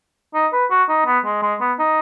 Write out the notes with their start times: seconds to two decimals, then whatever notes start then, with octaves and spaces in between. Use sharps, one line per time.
0.34 D#4
0.53 B4
0.71 F#4
0.89 D#4
1.06 B3
1.25 G#3
1.42 G#3
1.60 B3
1.79 D#4